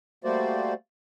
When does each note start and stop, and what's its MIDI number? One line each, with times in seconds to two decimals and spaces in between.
0.24 0.74 55
0.24 0.74 57
0.24 0.74 58
0.24 0.74 66
0.24 0.74 72
0.24 0.74 74